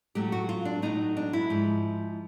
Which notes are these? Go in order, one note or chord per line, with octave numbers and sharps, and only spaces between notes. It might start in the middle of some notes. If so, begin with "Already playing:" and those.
A2 F#3 A3 G4
F#4
F4
D4
A2 F#3 A3 D#4
D4
E4
G#2 F3 G#3